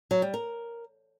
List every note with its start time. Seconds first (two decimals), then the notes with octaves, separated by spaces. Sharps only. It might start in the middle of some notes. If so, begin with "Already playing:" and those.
0.11 F#3
0.22 G3
0.34 A#4